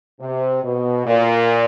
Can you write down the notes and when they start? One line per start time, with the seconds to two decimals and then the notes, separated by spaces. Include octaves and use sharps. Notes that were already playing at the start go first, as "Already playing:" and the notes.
0.21 C3
0.64 B2
1.07 A#2